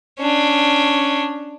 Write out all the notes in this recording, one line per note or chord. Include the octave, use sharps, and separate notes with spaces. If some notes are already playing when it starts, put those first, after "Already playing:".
C#4 D4